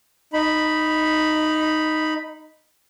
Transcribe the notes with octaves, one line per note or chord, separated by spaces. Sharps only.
D#4 B5